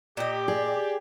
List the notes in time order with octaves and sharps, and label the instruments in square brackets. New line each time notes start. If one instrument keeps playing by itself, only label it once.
[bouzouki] A#2 D#5 [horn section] G4
[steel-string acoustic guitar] G#4 [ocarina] D5